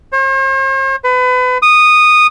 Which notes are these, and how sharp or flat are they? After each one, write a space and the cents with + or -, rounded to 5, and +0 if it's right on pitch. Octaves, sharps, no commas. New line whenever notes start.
C5 +45
B4 +30
D#6 -10